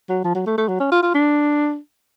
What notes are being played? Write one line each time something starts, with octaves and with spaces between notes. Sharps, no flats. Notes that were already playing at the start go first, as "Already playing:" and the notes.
F#3
F3
F#3
A3
A3
F#3
C#4
F4
F4
D4